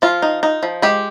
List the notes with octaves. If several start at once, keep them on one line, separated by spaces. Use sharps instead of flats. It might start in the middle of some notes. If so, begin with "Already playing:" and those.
F3 F4
D#4
D#4
F3
G#3 G4